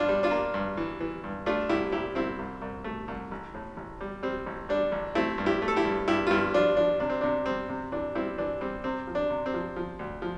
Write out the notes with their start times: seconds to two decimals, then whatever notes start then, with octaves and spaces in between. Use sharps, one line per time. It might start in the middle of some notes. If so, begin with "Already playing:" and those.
Already playing: G2 D4 F4
0.08 G3
0.23 D4 F4
0.31 A#3
0.54 G2
0.77 E3
1.00 E3
1.24 G2
1.46 A3 D4 F4
1.69 C2 E4 G4
1.92 A#2 E4 G4
2.15 C2 C4 E4
2.39 C2
2.62 C2
2.84 A3
3.08 C2
3.31 A1
3.54 A2
3.77 A1
4.01 G3
4.23 G3 C4
4.46 A1
4.69 G3 D4
4.92 A1
5.15 A3 C4 E4
5.38 G2
5.46 E4 G4
5.62 A3
5.68 A4
5.76 E4 G4
5.85 G2
6.08 G2 E4 G4
6.27 F4
6.31 G2 E4 G4
6.54 F3 D4 F4
6.77 F3 D4
7.00 C3 D4
7.10 C4
7.21 C3 D4
7.46 G3 C4
7.69 C3
7.92 E3 D4
8.15 G3 C4 E4
8.38 E3 D4
8.61 G3 C4
8.84 C3 C4
9.07 F3
9.15 D4
9.30 C3
9.46 C4
9.54 F3
9.76 F3
9.99 D2
10.22 F3